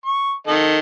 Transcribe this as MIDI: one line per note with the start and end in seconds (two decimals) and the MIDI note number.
0.06 0.32 85
0.47 0.79 51
0.47 0.79 69
0.47 0.79 75